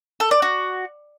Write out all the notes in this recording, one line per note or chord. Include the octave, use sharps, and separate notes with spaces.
A4
D5
F#4